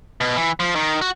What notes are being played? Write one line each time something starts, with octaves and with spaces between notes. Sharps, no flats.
B2
E3
F3
D#3
F#4